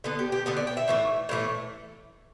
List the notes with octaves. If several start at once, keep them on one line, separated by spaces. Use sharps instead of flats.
D3 B3 A4
G4
G4
D3 B3 A4
D5
G5
E5
A2 E3 A3
A2 E3 A3